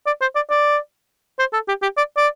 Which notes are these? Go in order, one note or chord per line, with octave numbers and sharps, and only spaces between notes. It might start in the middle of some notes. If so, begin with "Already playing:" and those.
D5
C5
D5
D5
C5
A4
G4
G4
D5
D5